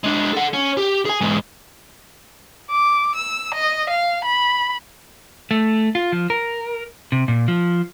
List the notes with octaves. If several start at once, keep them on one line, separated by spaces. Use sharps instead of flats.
G#3 D4
A4 F#5
C#4
G4
G#4 G#5
E2 G#2
D6
E6
D#5
F5
B5
A3
F4
F3
A#4
C3
A#2
F3